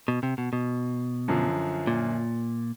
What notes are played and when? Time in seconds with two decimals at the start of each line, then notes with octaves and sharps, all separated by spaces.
0.08 B2
0.23 C3
0.38 B2
0.53 B2
1.28 F#2 D3 F3
1.87 A#2